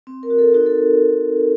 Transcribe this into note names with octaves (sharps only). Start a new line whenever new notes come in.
C4
A#4
F#4
A4
D#4 F#4
A4